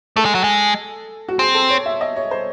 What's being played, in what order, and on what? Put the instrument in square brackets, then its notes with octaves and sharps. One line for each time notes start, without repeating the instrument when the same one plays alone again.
[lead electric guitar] A3 [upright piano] A4
[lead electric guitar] G#3
F#3
G#3
[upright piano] F#4
[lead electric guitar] C4 [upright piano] G#4
[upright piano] A4
C#5
E5
D#5
C#5
C5